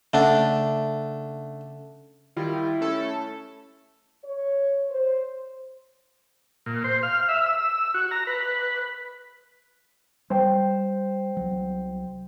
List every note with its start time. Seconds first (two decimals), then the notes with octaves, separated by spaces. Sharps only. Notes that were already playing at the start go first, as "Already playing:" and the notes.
0.13 C#3 A3 D4 E5 F#5 A5
2.37 D#3 G3 E4 F4
2.81 A3 C#4 A4
4.24 C#5
4.90 C5
6.66 A#2
6.84 C5
7.03 F5
7.29 E5
7.46 E6
7.94 F#4
8.11 A#5
8.27 B4
10.30 G3 C5 G5
11.37 C2 F#3